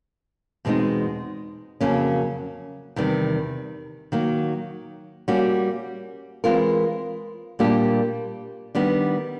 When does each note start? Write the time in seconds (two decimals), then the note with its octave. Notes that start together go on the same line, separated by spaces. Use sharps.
0.65 E2 B2 G#3 C4 D#4
1.80 F2 C#3 F#3 A#3 C#4
2.96 E2 C3 D#3 G3
4.12 D#3 F#3 A#3
5.28 G3 A#3 C#4 F#4
6.44 E3 G#3 C4 F4 A#4
7.59 A#2 G3 A#3 D4 G4
8.75 D#3 G3 B3 D4